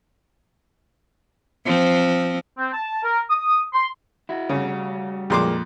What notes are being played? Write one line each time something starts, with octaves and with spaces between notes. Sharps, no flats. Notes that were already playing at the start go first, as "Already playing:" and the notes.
F3 C4
C4
A5
A#4
D#6
C6
E4 F#4
C#3 G3 F#4
F2 A#2 G#3 A#3 C6 D6